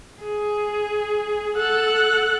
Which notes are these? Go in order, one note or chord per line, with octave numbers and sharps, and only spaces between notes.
G#4
A4 F#5